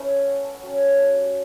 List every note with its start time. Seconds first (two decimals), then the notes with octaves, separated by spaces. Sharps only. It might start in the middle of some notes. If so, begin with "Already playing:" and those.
Already playing: A3 B3 C#4 E4 A4 B4 C#5
0.08 E5
0.27 F#5
0.45 A5
0.55 F#5
0.63 F#3 A3 C#4 G5
0.99 A4
1.18 G4